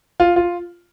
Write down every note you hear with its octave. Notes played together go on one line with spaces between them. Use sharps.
F4
F4